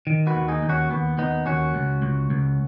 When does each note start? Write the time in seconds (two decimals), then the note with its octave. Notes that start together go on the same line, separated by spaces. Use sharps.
0.07 D#3
0.27 F#4 B4
0.35 D#2
0.48 D#4 G#4
0.62 D#2
0.69 C#4 F#4
0.90 D#2 B3
1.18 D#2 B3 D#4
1.46 D#2 C#4 F#4
1.75 C#2
2.02 C#2
2.30 C#2